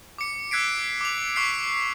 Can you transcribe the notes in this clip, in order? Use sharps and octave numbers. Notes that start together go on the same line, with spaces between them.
D6 C#7
E6 F#6 G#6 B6 C7 D7
D6 F7
C#6 D6 E6 F#6 B6 C7